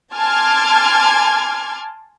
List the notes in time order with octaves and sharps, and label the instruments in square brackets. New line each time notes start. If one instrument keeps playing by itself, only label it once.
[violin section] G#5 A5 C6 D6 F6 G#6